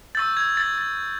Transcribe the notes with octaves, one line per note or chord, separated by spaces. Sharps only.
C#6 E6 G6 A6
G#6
A6
A6